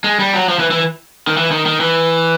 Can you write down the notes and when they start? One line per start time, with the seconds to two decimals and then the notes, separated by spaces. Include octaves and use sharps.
0.04 G#3
0.19 G3
0.34 F#3
0.49 F3
0.59 E3
0.71 E3
1.27 D#3
1.37 E3
1.51 D#3
1.66 D#3
1.80 E3